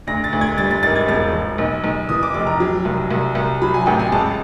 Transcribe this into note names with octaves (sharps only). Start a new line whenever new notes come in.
D2 A#6
A6
D2
G#6
G3 A6
A6
G#1 A6
G#6
E1 A6
E1
B1
B1
E3 D#6
D6
F1 D6
A#5
F#3
C2
C2
C2
F#3 B5
G#5
A1 G5
G#5
C#2 A5